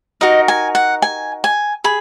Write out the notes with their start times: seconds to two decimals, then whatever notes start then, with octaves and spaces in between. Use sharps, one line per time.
0.21 D#4 F#4 A#4 D#5
0.48 G#5
0.75 F#5
1.02 G#5
1.44 G#5
1.84 G#4 B5